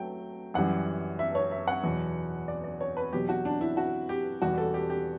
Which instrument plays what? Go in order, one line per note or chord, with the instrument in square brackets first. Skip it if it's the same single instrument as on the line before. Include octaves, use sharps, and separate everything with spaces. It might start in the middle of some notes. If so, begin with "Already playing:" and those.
Already playing: [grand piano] F#3 A3 [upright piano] G5
[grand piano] F#2 E3 G3 [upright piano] F#5
[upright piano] E5
C#5
E5
F#5
[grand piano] E2 B2 F#3
[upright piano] D5
D5
C#5
B4
[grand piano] E2 B2 F#3 [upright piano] G4
[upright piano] F#4
D4
E4
F#4
G4
[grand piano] E2 B2 G3 [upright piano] F#4
[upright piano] A4
G4
G4